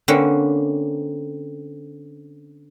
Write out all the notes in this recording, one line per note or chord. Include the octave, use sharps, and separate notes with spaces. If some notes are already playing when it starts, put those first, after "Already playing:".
D3 A#3 C4 C#4 B4